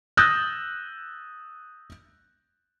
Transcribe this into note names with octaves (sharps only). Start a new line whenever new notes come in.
D#6 E6 F#6 G6 A6 A#6